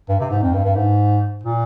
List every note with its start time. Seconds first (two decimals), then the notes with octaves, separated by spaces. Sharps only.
0.09 G2
0.20 C3
0.30 G#2
0.43 F2
0.54 G2
0.65 G2
0.76 G#2
1.44 A#2